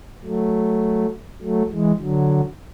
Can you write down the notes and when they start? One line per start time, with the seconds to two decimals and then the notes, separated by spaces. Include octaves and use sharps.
0.24 F#3 A3
1.42 F#3 A3
1.71 E3 G#3
2.00 D3 F#3